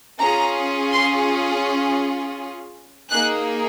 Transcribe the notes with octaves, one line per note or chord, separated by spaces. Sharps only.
C#4 F4 G#4 A#5
C6
A#3 D#4 G#4 F#6